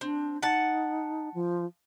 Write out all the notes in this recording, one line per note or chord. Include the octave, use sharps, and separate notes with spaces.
C4 D4
D#4 F#5 A5
F3